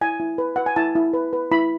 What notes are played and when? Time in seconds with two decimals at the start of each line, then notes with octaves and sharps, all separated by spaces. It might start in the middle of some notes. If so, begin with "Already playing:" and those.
0.01 E4 G#5
0.20 E4
0.38 B4
0.56 B4 F#5
0.66 G#5
0.76 E4 A5
0.95 E4
1.13 B4
1.33 B4
1.51 E4 B5